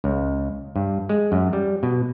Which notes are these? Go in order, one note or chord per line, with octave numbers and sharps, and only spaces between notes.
C#2
G2
G#3
F#2
G3
B2